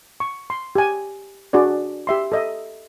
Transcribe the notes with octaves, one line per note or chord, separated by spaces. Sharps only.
C#6
C6
G4 G#5
D4 F#4 G#4 D5
G4 E5 C6
A4 D#5 E5